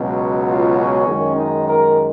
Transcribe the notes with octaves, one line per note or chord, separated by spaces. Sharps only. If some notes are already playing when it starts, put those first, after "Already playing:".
Already playing: C#2 B2 F#3
F4
C#4
F#2 D#3 G#3
D#4
A#4